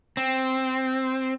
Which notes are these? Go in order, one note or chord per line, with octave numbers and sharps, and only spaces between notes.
C4